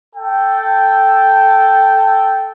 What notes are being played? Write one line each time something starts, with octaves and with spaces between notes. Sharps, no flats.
A4 G5